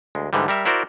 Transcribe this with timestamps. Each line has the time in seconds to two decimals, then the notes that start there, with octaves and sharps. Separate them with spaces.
0.15 D2 G#3
0.33 G#2 D3 E3 G3
0.48 G3 A#4 E5
0.65 E4 F#4 A#4 C5 D5